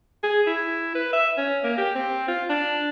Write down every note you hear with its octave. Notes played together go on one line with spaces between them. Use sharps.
G#4
E4
B4
E5
C#4
A#3
G4
C4
F4
D4